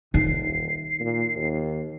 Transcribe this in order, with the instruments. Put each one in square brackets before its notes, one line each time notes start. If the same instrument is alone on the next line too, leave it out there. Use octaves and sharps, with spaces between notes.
[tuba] D#1 [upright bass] D#3 D#4 [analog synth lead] C7
[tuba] A#2
D#2